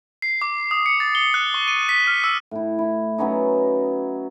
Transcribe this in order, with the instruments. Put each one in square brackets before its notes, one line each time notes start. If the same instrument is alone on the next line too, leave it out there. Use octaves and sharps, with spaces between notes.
[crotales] C7
D6
D#6
C#7
A6
G7
F#6
C#6
D#7
B6
F6
E6
[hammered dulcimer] A2 E4
E4
F#3 B3 C#4 D#4